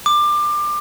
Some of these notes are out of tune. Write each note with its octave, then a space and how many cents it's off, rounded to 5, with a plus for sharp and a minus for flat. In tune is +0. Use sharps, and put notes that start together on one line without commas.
D6 +25